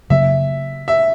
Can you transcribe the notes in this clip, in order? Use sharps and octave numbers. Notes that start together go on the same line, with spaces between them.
C#3 F#3 A#3 E5
E5